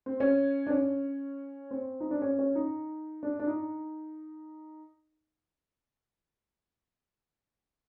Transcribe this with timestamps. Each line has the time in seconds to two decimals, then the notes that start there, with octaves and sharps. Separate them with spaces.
0.06 C4
0.20 C#4
0.67 D4
0.70 C#4
1.71 C4
2.00 D#4
2.11 D4
2.22 C#4
2.39 C#4
2.55 D#4
3.23 D4
3.40 D4
3.47 D#4